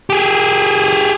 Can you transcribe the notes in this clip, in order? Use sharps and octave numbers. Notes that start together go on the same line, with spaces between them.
G4 G#4